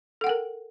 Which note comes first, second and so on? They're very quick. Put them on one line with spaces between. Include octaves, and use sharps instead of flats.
A4 F#5 G5 A#4